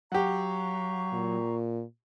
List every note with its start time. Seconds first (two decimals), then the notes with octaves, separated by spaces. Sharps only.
0.12 F#3 G4 F5 F#5 A#5 C#6
1.13 A#2